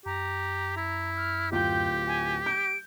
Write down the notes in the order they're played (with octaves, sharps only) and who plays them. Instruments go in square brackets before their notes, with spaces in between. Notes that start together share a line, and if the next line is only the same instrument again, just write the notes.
[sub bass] F#2 [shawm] G4 [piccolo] A#5
[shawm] E4
[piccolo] F6
[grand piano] D1 F4 G5 [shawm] G4 [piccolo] G6
[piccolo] G#5
[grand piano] G6 [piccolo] D7